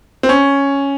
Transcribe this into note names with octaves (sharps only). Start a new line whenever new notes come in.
C4
C#4